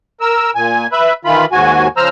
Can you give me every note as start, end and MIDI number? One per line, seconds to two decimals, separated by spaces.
0.21 0.51 70
0.21 0.51 88
0.55 0.87 46
0.55 0.87 80
0.92 1.13 71
0.92 1.13 76
0.92 1.13 83
1.25 1.45 51
1.25 1.45 52
1.25 1.45 65
1.25 1.45 83
1.52 1.88 39
1.52 1.88 44
1.52 1.88 66
1.52 1.88 80
1.97 2.09 49
1.97 2.09 53
1.97 2.09 72
1.97 2.09 82
1.97 2.09 88
1.97 2.09 89